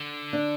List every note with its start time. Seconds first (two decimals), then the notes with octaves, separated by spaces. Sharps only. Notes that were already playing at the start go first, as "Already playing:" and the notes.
Already playing: D3
0.33 D4